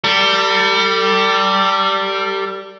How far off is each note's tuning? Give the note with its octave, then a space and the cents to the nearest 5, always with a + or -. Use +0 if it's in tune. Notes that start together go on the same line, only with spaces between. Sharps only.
G3 -10 A4 +40